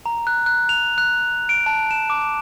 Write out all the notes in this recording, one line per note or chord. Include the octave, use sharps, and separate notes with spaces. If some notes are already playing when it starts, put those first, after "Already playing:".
A#5
F#6
F#6
F7
F#6
D7
A5
E7
D6